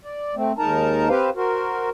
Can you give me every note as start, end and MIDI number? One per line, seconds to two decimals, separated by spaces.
0.04 0.35 74
0.35 0.53 57
0.35 0.53 60
0.58 1.08 39
0.58 1.08 56
0.58 1.08 63
0.58 1.08 70
0.58 1.08 81
0.58 1.08 82
1.09 1.30 60
1.09 1.30 67
1.09 1.30 71
1.09 1.30 72
1.09 1.30 77
1.36 1.90 66
1.36 1.90 70
1.36 1.90 72